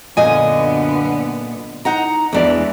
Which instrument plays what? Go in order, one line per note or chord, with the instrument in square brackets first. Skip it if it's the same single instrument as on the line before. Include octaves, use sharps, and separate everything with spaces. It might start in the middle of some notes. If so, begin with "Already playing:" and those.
[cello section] F#2 D3 B3 [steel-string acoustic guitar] A#2 D#5 G#5
[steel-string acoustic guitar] D#4 F#5 A#5
[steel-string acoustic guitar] E2 D4 D5 [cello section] E3 G#3